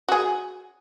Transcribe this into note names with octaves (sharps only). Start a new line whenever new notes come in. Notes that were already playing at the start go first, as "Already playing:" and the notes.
F#4 G#4